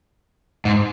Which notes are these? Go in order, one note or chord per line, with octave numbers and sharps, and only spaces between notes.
G#2